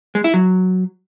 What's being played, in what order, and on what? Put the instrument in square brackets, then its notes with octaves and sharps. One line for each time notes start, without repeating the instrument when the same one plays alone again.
[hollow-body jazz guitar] G#3
E4
F#3